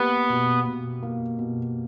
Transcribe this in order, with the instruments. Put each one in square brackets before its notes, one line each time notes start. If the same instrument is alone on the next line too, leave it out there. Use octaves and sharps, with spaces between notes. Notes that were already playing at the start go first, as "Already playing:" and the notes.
Already playing: [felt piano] A#3 G4 [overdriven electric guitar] B3
[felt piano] B2
B2
A#3
B2